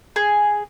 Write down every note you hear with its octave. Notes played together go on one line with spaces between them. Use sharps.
G#4